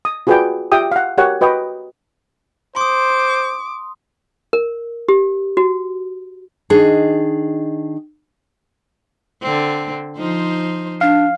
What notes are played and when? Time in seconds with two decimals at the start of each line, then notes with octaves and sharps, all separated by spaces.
0.05 D#6
0.27 F4 F#4 G#4 B4 D5 G5
0.72 F4 G4 E5 G5 D#6
0.91 F5 F#5
1.18 F#4 G4 A#4 C#5 F#5 C#6
1.41 F#4 B4 D#5 G5 C#6 D#6
2.76 C5 C6 D6 D#6
4.53 A#4
5.09 G4
5.57 F#4
6.70 D#3 D4 G#4 D#5
9.42 D3 C4
10.18 F3 D#4 C5
11.01 D4 F5